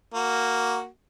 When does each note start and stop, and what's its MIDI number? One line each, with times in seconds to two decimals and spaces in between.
0.14 0.86 58
0.14 0.86 66